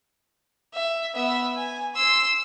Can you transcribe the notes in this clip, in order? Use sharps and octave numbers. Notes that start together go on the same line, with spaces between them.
E5
B3 E5
G#5
C6 E6